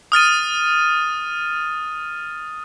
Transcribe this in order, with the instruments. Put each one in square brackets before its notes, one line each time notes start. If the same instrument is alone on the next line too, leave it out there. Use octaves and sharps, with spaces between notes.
[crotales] D#6 F6 A6 D#7